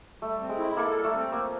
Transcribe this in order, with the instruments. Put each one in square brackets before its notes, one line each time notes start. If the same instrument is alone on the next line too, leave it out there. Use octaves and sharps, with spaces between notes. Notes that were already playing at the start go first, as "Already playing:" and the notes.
[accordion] G3 [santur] A3
[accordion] C4
[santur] G#3
[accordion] E4
[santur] A#3 [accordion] A4
[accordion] G3
[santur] A3
[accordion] C4
[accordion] F3 [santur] A#3